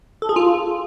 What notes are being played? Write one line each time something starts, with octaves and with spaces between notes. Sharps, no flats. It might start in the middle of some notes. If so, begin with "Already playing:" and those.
A4
G#4
F4